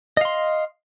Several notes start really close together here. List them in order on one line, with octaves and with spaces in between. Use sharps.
D#5 F5 C6